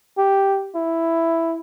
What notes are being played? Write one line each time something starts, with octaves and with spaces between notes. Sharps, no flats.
G4
E4